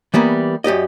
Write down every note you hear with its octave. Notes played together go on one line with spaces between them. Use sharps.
E3 G3 A#3 B3
F#2 G4 D5 D#5